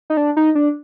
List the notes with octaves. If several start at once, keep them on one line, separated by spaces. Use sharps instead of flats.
D#4
D4
D#4
D4